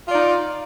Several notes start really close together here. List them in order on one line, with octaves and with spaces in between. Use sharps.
F4 D5 D#4